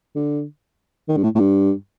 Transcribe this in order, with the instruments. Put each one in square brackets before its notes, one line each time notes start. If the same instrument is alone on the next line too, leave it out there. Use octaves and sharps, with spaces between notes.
[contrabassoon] D3
D#3
G2
A2
A2
G2